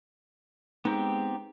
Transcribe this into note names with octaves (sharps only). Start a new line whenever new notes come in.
G#3 B3 C4 D#4 G4